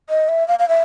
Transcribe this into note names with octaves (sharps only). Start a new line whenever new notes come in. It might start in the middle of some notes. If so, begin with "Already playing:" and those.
D#5
E5
F5
F5
E5